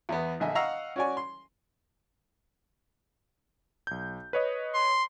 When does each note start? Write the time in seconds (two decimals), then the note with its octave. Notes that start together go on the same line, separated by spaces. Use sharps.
0.09 E2 B3
0.40 A#1 D3 D#5 E5 G#5
0.55 D#5 F5 F#5 A#5 C#6 E6
0.96 C#4 F#4 C#5 D5 G#5
1.17 C6
3.87 B1 G6
4.33 B4 C#5 D#5
4.74 C6